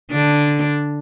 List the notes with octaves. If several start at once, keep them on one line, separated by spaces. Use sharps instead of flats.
D3 D4